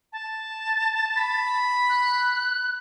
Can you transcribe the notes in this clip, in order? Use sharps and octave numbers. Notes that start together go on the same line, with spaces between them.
A5
B5
F#6